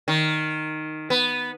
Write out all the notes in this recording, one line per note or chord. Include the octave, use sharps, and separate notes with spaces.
D#3
B3